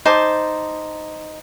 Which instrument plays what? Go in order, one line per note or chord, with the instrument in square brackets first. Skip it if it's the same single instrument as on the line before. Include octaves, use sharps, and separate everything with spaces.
[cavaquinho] D#4 C5 A5 D6